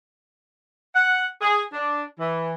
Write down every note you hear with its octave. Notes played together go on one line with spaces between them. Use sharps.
F#5
G#4
D4
E3